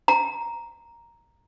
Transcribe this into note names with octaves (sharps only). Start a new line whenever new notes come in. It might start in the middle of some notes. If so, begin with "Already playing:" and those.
A#5